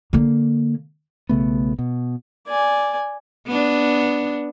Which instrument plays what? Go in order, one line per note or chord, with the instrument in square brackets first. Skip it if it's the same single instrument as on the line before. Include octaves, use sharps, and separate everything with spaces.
[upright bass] D3 A#3
[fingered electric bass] B1 C#3 A3 B3
B2
[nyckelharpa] D5 G#5
[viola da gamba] B3 D4